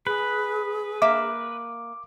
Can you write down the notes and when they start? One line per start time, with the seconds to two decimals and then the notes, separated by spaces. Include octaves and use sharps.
0.07 G#4 B4
1.02 A#3 E5 D6